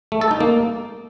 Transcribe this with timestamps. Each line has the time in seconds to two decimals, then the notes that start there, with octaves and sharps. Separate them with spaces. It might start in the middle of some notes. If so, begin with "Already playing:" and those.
0.12 A3
0.21 A4
0.31 D#4
0.40 A#3